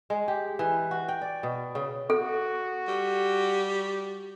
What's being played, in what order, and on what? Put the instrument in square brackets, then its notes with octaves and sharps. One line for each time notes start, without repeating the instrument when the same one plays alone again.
[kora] G#3
G4
E3
F#4
G5
D5
B2
C#3
[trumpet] F#4 [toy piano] A4
[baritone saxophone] G3